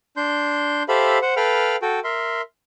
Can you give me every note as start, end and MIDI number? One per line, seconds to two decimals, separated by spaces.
0.17 0.83 62
0.17 0.83 84
0.17 0.83 91
0.89 1.19 67
0.89 1.19 69
0.89 1.19 72
0.89 1.19 76
0.89 1.19 77
0.89 1.19 83
1.22 1.34 72
1.22 1.34 78
1.36 1.76 69
1.36 1.76 71
1.36 1.76 77
1.36 1.76 79
1.36 1.76 83
1.36 1.76 89
1.82 2.00 66
1.82 2.00 69
1.82 2.00 79
2.04 2.41 70
2.04 2.41 76
2.04 2.41 84